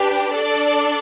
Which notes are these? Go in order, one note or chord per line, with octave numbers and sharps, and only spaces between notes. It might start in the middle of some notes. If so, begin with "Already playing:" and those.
Already playing: D4 G4 B4
D4 A4 D5